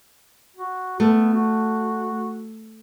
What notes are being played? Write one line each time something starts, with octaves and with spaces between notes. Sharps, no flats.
F#4
A3 B3
F#4